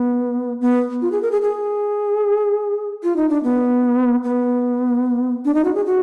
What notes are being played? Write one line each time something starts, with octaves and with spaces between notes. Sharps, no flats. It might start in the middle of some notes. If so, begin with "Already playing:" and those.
Already playing: B3
B3
F4
G#4
A#4
G#4
G#4
F4
D#4
D4
B3
B3
D4
D#4
F#4
G#4
F#4